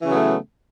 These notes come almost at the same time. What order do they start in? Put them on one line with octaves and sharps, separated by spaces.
E3 C#3 F#3 B3 A3